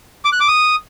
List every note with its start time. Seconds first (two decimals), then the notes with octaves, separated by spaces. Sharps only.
0.25 D6
0.32 F#6
0.40 D6
0.48 D#6